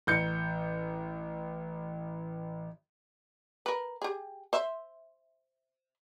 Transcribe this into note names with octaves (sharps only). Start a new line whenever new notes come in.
A1 G6 C#7
A#4 B4
G4 G#4
C5 E5